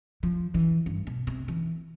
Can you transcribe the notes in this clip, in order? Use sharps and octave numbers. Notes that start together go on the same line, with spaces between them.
F3
E3
G2
B2
C3
E3